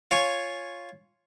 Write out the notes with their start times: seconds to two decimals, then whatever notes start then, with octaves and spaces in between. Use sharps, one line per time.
0.11 F4 C#5 G#5 C#6